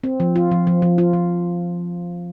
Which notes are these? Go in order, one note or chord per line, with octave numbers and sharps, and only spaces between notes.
C4
F3
F4
F3
F3
F3
F4
F3